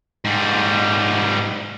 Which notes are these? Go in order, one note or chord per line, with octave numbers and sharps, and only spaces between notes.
G#2 G3